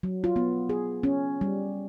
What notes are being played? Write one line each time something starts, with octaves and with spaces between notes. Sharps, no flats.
F#3
F4
B3
G#4
C#4
G3